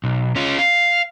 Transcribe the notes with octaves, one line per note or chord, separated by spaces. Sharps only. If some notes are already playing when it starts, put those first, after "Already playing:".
B1
C#4 F4
F5